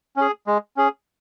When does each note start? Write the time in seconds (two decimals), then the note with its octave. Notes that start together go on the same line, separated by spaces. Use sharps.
0.16 C#4 G#4
0.47 G#3
0.77 C#4 G#4